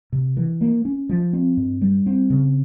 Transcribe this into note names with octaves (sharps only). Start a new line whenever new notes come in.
C3
E3
A#3
C#4
F3
C4
G2
G3
C4
C#3